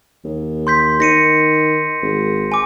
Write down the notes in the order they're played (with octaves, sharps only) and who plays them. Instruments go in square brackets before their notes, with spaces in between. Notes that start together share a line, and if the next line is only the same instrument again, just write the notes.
[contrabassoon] D#2
[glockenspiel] C6 G6 B6
[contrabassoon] D#3 [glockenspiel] A#6 C#7 D#7
[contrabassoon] G#1
[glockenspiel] G#5 D6